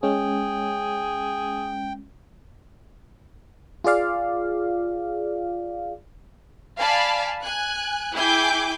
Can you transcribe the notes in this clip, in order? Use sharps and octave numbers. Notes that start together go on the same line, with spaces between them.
G#3 C#4 G#4 G5
F4 G#4 D5 F5
D5 F5 G#5 A5 B5
G#5 F#6
E4 G#4 G5 G#5 D6 G6